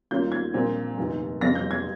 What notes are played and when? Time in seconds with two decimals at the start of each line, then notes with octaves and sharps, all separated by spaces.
0.11 D#2 D#3 A#3 C#4 F4 G6
0.32 G#6
0.54 A#1 A#2 F3 C4
0.98 F1 D#2 D#3
1.41 F1 F2 C#3 A#6
1.55 G6
1.71 G#6